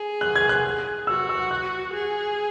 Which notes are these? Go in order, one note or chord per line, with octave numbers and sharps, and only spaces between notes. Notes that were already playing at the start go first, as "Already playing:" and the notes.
Already playing: G#4
F#6
G#6
F#6
F#4 E6
E6
F#6
G#4